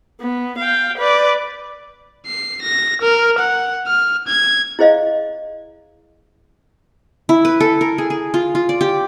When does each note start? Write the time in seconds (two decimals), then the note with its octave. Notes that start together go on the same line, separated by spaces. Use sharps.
0.20 B3
0.58 F5 G5
0.98 B4 D5
2.26 C7
2.61 A#6
3.01 A#4
3.39 F#5
3.87 F6
4.27 G#6
4.79 E4 G#4 C5 D#5 F5
7.29 E4
7.45 B4
7.60 A4
7.81 A#4
7.98 G#4
8.10 G#4
8.34 F4
8.55 F4
8.69 D5
8.81 G4